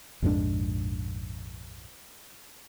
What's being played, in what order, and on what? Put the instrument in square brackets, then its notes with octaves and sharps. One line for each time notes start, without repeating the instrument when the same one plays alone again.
[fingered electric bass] A#1 F2 G#2 D4